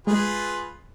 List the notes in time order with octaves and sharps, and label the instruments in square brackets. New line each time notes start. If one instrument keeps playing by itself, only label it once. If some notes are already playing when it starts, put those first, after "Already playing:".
[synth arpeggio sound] G#3 [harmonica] F4 G#4 B4